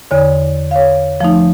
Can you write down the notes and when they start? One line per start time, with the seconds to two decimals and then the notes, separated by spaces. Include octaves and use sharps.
0.11 E2 D3 C#5
0.71 C#5 F5
1.21 F3 A3 D#4